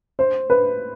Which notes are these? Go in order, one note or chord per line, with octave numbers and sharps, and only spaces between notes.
C5
B4